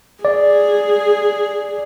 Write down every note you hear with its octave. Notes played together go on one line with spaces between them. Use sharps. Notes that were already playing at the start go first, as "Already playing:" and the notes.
G#4 D5